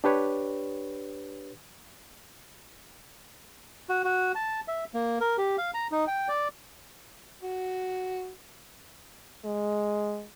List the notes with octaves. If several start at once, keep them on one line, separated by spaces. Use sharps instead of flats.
D4 G4 B4 C#5
F#4
F#4
A5
E5
A#3
A#4
G4
F5
A#5
D#4
G5
D5
F#4
G#3